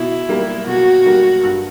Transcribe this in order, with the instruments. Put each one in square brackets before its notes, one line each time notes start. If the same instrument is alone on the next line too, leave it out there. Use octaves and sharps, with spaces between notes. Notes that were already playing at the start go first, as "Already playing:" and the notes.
Already playing: [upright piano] B2 [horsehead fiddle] E4
[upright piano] G3 A#3
[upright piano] B2 [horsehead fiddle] F#4
[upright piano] G3 A#3
G2